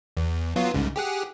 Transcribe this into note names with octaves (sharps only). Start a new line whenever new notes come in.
E2
F#3 B3 F4
C2 G#2 C#3
G4 G#4 F#5